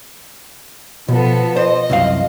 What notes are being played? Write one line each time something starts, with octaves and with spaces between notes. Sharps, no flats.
B2 F3 B3 A4
C5 D#5
C2 F#2 F5